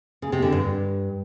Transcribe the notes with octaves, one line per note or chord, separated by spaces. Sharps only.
C#3
C3
D3
G2